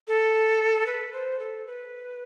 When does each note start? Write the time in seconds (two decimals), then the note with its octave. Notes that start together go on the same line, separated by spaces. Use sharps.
0.08 A4
0.86 B4
1.13 C5
1.39 A4
1.67 B4